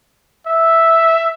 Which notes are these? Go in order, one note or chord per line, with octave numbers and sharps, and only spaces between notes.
E5